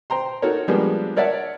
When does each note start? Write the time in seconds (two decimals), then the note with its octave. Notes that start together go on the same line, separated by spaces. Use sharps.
0.10 C5 G5 A#5 C6
0.42 D#4 F#4 A4 A#4 C#5
0.68 F3 G3 G#3 A#3 B3 D4
1.16 A#4 C#5 D5 E5 F#5 A5